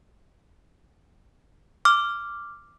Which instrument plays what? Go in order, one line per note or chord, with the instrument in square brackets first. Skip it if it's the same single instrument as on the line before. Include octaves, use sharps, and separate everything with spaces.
[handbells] D6 F6